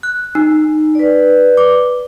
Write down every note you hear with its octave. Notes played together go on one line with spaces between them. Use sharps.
F#6
D#4
B4 D5
D6